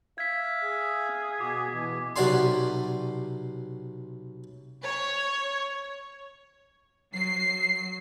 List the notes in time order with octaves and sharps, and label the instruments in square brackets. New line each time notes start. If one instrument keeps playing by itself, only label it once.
[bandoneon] E5 F5 [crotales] G#6 B6
[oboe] G#4
[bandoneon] B2 F#4 [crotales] D6
[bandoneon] B2 E3
[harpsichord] B1 C3 F#4 D5 G#5 C6
[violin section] C#5
[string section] F#3 C7